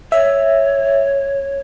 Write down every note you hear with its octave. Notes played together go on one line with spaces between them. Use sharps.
C#5 E5